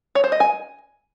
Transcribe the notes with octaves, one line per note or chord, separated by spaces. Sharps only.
C#5
C5
D#5
G#5